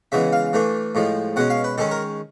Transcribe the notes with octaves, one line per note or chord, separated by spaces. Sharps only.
C#3 E3 G#3 B3 E5
F5
E3 A3 D4
A2 F3 G#3
B2 G#3 C#4 F#5
F5
B4
D#3 G#3 C#4 A4
A#4